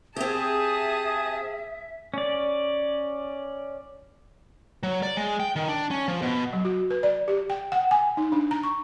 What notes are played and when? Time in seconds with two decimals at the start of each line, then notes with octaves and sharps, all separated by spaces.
0.16 C4 G4 G#4 E5 A5 D#6
2.14 C#4 D5
4.83 F#3
5.03 D5
5.17 G#3
5.40 G5
5.56 D#3
5.68 D4
5.91 C#4
6.08 F3
6.22 B2
6.53 F#3
6.65 F#4
6.90 B4
7.03 D5
7.28 G4
7.50 G5
7.72 F#5
7.91 G#5
8.17 D#4
8.32 D4
8.51 A#5
8.63 C#6